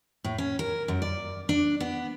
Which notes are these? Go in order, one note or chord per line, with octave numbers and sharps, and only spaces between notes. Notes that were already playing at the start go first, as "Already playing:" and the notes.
A2
C#4
A#4
F#2
D5
D4
B3